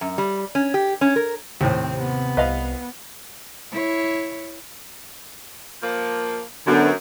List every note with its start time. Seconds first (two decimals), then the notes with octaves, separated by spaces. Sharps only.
0.01 F#2
0.18 G3
0.55 C#4
0.74 G4
1.01 C#4
1.16 A#4
1.61 D#2 A2 C3 C4
1.99 B3
2.37 C2 B4 D#5 F5
3.72 E4 C#5
5.82 F3 A#3
6.66 F#2 D3 B3